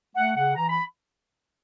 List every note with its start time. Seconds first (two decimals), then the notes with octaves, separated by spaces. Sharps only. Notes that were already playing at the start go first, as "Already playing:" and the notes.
0.16 A3 F#5
0.35 C#3 F#5
0.56 E3 A#5
0.69 B5